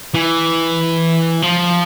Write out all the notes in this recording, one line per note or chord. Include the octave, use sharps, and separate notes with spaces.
E3
F3